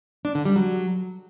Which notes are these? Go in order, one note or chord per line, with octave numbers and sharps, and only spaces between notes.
D4
D3
G3
F#3